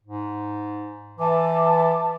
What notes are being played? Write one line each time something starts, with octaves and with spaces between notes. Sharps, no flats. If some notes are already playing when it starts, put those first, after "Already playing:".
G#2
E3 E5 A5 D6